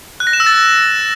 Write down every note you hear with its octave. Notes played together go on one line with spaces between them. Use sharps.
F#6
A#6
E7
E6
A6